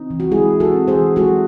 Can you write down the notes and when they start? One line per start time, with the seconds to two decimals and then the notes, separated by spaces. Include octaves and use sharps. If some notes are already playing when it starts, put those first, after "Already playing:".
Already playing: C4 D#4
0.10 E3
0.20 F#4
0.31 G#3 E4 G#4
0.53 E3
0.60 F#4 A4
0.74 C4
0.88 G#4 C5
0.95 E3
1.16 G#3 F#4 A4